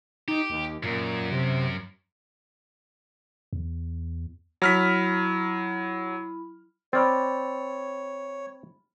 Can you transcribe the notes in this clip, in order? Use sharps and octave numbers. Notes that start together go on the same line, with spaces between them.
D#4 G4
D#2
F#2 A#2
C3
E2
F#3 E4 B5 F6 B6
C4 C#5 D5 B5 F6 A6